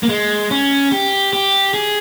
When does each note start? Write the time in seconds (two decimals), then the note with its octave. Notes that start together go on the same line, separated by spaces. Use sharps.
0.03 A#3
0.09 G#3
0.51 C#4
0.92 G4
1.33 G4
1.74 G#4